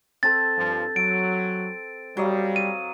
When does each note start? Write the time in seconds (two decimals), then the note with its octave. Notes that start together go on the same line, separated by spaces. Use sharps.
0.23 C4 A4 A6
0.57 G2 F3
0.96 F#3 D7
2.17 F#3 G3 D#5 F5
2.56 D#7